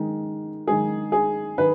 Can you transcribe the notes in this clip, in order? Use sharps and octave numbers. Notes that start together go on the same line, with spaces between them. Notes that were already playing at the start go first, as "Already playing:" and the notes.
Already playing: D#3 G#3
D#3 G#3 G#4
G#4
D#3 B4